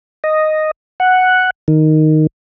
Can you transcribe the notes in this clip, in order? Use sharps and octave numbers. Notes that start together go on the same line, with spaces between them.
D#5
F#5
D#3